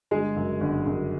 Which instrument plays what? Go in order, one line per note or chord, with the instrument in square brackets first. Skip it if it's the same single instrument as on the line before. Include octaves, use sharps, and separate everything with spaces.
[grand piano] G1 G#3 G#4
F#2 C#3
G1
F#2 C#3